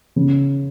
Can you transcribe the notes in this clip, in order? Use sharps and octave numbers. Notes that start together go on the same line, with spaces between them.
C#3